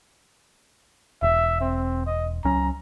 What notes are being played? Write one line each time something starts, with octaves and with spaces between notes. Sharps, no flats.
E1 E5
C4
D#5
C#2 F#3 C#4 A#5